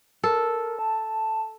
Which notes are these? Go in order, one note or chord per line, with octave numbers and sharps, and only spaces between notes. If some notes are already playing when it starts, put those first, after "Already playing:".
A4 A#4
A5